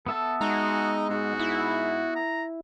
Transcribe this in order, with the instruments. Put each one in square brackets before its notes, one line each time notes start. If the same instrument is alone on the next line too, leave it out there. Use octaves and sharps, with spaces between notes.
[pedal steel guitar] B3 E5 A5 [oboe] A4
[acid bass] G#3 [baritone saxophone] D#4 [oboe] F#4
[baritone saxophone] G#2 [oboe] F#4
[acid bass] E4
[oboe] A#5